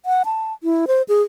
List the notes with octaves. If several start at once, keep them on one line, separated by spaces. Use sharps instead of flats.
F#5
A5
E4
C5
G#4